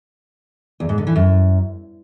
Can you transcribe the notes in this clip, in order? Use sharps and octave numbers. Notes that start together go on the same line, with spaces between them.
E2
G#2
D3
E3
F#2